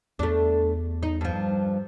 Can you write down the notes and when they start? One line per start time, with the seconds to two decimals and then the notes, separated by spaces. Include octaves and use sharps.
0.19 E2 A3 D4
1.03 D#4
1.21 G2 F3